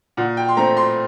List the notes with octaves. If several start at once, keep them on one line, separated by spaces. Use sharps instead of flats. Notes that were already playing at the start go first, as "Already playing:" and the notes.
A#2 F#5
G5
C6
A3 C4 A#5
C6